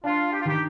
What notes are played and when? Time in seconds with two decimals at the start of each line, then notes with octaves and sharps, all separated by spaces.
0.04 D4 F4
0.32 G4
0.40 F4
0.45 D#3 G4